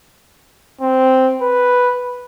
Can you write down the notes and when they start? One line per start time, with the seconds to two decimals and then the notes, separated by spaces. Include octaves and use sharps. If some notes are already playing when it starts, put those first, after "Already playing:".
0.81 C4
1.42 B4